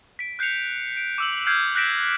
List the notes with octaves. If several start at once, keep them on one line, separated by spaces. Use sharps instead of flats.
B6 D7
F#6 G6 C7 C#7 F7
D7
D6 E6 F#7
F6 G6 G#6 C7 D7
F#6 G6 A#6 B6 D7 E7